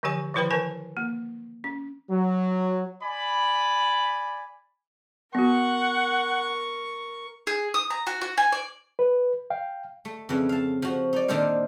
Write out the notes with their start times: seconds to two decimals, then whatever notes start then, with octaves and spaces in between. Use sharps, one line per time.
0.03 D3 E3 F3 G4 G#5 C#6
0.34 D#3 F3 E4 B4 G5 B5
0.51 E3 A#4 B4 G#5 A5
0.97 A#3
1.64 C#4
2.10 F#3
3.03 D5 G#5 B5
5.35 B3 F#4 A#4 F#5 C#6
7.47 G#4
7.74 D#6
7.90 A#5
8.07 F#4
8.21 F#4
8.38 G#5
8.52 D5
8.99 B4
9.50 F5 G5
10.05 A3
10.29 F2 C#3 E3
10.49 F5 A5
10.82 F3 F#4
11.13 D#4 D5
11.28 A#2 D#3 D4 A4 C5 F5